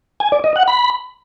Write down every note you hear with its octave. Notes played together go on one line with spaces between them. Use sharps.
G#5
D5
D#5
F#5
B5